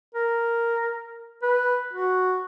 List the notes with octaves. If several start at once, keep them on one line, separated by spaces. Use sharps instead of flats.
A#4
B4
F#4